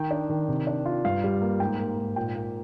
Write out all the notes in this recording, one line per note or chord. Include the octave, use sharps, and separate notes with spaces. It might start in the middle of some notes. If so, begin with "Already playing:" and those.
Already playing: D#3 D#4 G5
D4
D#3
C3
D4
F4
G2 F5
G3
A#3
G#2 G5
A#3
G#2
A#2 G5
A#3